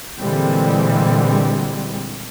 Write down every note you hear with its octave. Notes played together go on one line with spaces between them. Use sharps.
A#2 D3 E3 G3 G#3 C4